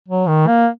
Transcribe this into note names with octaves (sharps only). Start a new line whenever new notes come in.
F#3
D#3
A#3